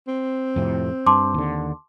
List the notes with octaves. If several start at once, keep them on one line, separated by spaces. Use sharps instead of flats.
C4
F2 A2 C3
G2 A5 C6 D6
D#2 D3